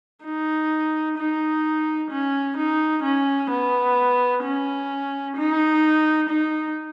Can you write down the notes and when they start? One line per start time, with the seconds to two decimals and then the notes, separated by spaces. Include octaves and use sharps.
0.24 D#4
1.18 D#4
2.11 C#4
2.57 D#4
3.03 C#4
3.50 B3
4.44 C#4
5.37 D#4
6.29 D#4